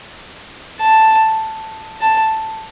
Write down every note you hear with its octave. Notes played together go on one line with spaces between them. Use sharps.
A5
A5